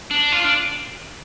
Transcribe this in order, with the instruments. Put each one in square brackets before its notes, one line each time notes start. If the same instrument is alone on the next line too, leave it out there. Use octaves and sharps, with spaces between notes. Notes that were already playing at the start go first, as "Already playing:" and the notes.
[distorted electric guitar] D4
F4
D4